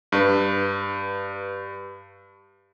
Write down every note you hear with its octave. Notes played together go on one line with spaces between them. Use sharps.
G2 B4